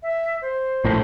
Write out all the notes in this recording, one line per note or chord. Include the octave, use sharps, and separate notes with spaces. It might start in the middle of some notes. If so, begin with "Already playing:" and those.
E5
C5
A#1 A2